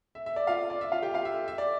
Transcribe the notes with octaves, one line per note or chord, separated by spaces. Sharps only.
E5
E5
D5
F4 F5
D5
E5
F4 F5
G4 G5
F4 F5
E5
E5
E5
D5